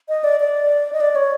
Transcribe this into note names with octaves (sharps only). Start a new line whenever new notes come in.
D#5
D5
D5
D#5
D5
C#5